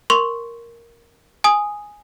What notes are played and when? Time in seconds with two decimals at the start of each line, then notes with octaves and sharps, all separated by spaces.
0.10 A#4 C6 C#6 F7
1.44 G#5 D#6